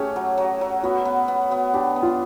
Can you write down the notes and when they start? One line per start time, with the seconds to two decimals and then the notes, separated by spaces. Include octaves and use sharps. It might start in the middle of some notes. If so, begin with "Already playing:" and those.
Already playing: A3 C#4 G4 G#4
0.16 F#3
0.38 F#3
0.61 F#3
0.83 B3 F#4
1.05 B3
1.28 B3
1.51 B3
1.74 D4 G4
1.96 B3
2.03 F4